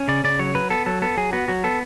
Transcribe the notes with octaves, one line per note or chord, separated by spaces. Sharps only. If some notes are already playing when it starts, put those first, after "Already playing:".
Already playing: C#4
C#3 D5
C#3 D5
F#3 C#5
F#3 B4
B3 A4
F#3 A4
B3 A4
F#3 G#4
B3 F#4
F#3 F#4
B3 A4